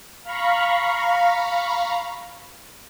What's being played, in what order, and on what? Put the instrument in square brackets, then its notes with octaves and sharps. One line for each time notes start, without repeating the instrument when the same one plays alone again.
[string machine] F5 A#5 B5 C#6